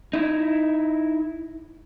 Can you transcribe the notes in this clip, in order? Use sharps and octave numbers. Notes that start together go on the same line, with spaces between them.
D#4 E4